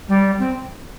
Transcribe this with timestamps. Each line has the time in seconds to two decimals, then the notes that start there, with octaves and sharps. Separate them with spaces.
0.08 G3
0.39 C4